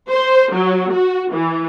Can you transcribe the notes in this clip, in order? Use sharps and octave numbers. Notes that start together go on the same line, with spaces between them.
C5
F#3
F#4
E3